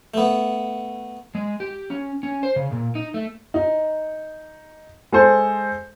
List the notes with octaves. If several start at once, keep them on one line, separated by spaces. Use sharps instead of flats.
A3 B3
G#3
G4
C#4
C#4
C5
C#3
A#2
D#4
A3
D#4
G#3 A4 C5